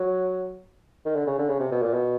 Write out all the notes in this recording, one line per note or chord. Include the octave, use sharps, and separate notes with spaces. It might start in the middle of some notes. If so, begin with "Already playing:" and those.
Already playing: F#3
D#3
D3
C#3
D3
C#3
C3
B2
A#2
B2